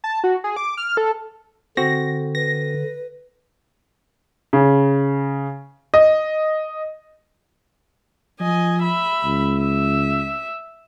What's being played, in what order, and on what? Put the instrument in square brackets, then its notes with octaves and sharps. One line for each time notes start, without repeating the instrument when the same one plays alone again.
[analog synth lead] A5
F#4
G#4
D6
F6
A4
[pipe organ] D3 [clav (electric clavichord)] C4 F#4 [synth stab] A#6
[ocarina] B4 [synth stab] A#6
[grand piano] C#3
D#5
[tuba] F3 [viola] D#5 G#5
[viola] E5 B5
[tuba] C#2
[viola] E5